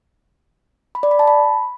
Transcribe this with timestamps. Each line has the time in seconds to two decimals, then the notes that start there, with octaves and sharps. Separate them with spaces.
0.95 B5
1.03 D5
1.11 B5
1.19 A5
1.27 B5